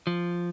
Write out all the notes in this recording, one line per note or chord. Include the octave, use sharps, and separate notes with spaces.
F3